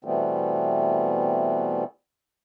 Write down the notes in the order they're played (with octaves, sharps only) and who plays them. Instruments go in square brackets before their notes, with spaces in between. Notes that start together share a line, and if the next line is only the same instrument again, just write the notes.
[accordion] B2 E3 G3 A3 B3 C4